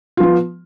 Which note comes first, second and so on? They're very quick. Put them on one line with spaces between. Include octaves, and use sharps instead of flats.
F4 F3 B3